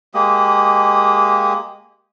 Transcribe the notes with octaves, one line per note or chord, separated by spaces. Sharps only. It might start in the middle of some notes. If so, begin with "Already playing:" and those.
G#3 A#3 G4 D#6